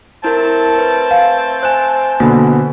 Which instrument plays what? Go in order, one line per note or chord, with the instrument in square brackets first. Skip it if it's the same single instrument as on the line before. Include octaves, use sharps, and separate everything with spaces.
[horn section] A3 C4 A5 [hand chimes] E4 A#4
[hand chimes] B4
[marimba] F5 [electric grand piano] G#5
[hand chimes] C5 G#5 [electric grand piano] F#6 E7
[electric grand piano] B2 D3 B5 [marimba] A#3